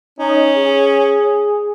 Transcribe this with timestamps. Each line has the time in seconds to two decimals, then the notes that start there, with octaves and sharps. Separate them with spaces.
0.19 C#4 D#4
0.56 G#4